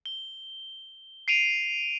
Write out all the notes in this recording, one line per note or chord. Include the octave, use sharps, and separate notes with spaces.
G7
C7 D7 D#7 F7